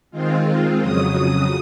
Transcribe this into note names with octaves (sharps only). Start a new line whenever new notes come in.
D#3 G#3 C4 F4
F2 C#3 F#3 D#6